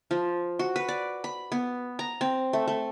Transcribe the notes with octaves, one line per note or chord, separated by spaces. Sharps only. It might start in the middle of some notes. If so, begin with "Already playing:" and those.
F3
F#4
B4
D5
B5
B3
A#5
C4
A3
A3